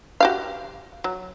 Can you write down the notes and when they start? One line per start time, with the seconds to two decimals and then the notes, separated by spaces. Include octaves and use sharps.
0.20 F#4 G4 F5
1.04 F#3